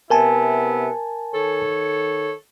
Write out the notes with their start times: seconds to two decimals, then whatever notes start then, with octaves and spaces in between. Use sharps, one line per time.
0.10 C3 B3 E4 A#4 G#5 A5
1.34 D#3 A4 C#5